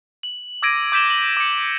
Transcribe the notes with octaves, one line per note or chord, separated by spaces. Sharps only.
F#7
D6 E6 G#6 A#6 D7 D#7
D6 G6 B6 E7 G7
F#7
D6 C#7